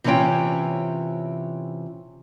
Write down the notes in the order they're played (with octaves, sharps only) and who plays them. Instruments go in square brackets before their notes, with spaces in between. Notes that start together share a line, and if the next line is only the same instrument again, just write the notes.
[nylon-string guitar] C3 E3 C#4 F4 C#5 G5